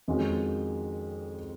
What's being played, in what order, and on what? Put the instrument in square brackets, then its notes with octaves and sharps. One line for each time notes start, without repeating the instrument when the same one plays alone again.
[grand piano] F2 D#3 G#3 C#4 F#4